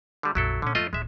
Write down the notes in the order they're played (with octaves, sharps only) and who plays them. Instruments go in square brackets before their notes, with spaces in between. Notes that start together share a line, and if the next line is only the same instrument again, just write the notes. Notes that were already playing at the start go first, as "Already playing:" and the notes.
[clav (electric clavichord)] D3 G3
[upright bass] A#1 F2 [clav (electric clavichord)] F#3 E4 A4
[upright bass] A#2 [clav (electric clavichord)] D3 C#4
[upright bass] F2 [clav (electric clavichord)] A3 F4 D#5
[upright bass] D1 D#3 [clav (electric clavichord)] G#3 E5